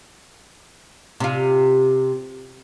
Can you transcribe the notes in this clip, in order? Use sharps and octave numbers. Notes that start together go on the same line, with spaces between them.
C3 F4